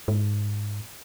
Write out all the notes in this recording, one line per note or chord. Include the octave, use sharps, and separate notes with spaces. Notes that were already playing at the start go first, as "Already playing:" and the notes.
G#2